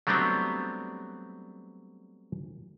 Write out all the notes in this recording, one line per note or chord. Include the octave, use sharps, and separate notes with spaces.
F#3 G3 A3 B3 C4 D4